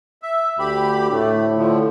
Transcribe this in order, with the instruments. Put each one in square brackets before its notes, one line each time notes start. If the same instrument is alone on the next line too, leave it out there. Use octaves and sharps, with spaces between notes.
[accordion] E5
[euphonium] D2 [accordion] G4 B5
[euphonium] A2 [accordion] A3
[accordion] D3 F3